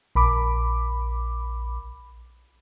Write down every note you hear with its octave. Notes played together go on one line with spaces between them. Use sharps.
A#1 B5 D6